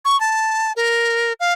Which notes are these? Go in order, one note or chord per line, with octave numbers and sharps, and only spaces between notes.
C#6
A5
A#4
F5